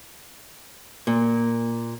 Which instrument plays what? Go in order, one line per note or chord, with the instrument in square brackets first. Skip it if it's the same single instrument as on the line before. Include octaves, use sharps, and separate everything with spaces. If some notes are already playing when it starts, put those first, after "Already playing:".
[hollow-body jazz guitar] A#2